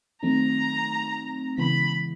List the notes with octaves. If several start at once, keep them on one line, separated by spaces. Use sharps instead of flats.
D#3 F#3 A3 C4 D#4 A#5
C#3 E3 G#3 B3 E4 B5